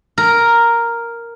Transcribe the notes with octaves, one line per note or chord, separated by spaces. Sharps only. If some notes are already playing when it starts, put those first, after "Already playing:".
A#4